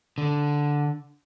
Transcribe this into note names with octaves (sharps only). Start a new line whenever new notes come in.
D3